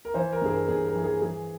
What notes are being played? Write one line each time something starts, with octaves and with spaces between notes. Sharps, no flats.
A#4
E3 C5
A#4
G2 G#4
A#4
G2 G#4
A#4
E3
G#4
E3 G#4